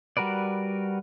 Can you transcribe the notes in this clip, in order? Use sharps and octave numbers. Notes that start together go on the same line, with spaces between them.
G3 F#4 A#4 B4 D5